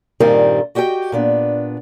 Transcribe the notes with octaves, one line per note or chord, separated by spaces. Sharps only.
G2 A#2 D#3 G3 C4 A#4
F#4 G4 D#5 E5 G5
A#2 B3 D4